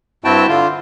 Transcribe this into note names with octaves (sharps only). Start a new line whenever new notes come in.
G2 C4 E4 F#4 G5 A5
D3 F4